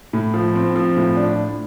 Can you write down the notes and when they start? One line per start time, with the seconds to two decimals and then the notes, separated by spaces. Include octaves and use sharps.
0.13 A2
0.34 F3
0.55 C4
0.75 F3
0.97 A2
1.17 D4